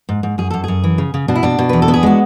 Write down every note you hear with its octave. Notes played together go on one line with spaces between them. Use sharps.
G#2
G#2
F#2 G#4
F#2 A4
F#2 G#4
E3
C#3
C#3
B2 D4
E4
B2 D4
B2
E2 B4
A4
B3
G#4
G#3 F#4